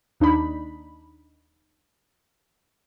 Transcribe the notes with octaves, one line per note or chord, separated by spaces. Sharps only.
D#2 D4 D#4 B5